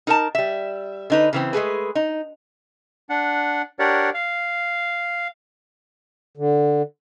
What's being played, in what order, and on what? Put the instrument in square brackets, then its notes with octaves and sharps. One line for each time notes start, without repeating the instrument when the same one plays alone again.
[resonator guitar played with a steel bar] D#4 A#4 A5
G3 E5
D3 D#4 B4
C#3 E3 C4
G#3 A3 G#4 B4
D#4
[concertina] D4 F#5
D4 G4 A#4 C#5 D5 F#5
F5
[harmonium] D3